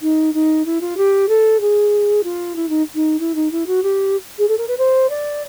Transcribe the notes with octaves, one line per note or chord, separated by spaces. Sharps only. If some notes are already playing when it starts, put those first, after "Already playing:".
D#4
D#4
E4
F4
G4
A4
G#4
F4
E4
D#4
D#4
E4
D#4
E4
F#4
G4
G#4
A4
A#4
B4
C5
D5